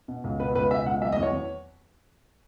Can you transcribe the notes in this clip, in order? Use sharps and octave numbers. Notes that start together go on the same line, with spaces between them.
B2
C#2
B2 B4
C#2 B4
B2 E5
C#2 F#5
F#3 E5
D#5
E2
C#5
E2